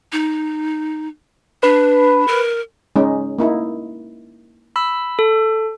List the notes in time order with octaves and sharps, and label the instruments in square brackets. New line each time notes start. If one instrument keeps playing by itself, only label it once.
[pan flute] D#4
[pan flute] D4 [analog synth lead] B4
[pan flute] A#4
[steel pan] G#3 C#4 D#4
A#3 D#4 E4
[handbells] B5 E6
A4